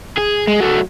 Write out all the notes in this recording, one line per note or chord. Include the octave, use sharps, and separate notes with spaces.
G#4
G#3
F#3 A3